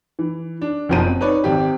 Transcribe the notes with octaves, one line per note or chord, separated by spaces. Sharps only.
E3
D4
F#1 F#2 B2 F3 C5 D#7
C4
D#4 B4 C#5 D5
G#1 C4 G4